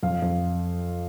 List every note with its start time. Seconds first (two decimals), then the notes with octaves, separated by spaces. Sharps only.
0.03 F2 F5
0.22 F2